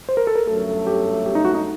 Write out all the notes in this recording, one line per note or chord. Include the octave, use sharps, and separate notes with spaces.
C5
A#4
A4
A#4
G1 F#2 F#3 A3 A4
G4
G4
D#4
F#4
D#4